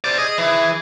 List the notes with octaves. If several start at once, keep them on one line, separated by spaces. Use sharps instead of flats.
C5 D5
G#4 D#5
E3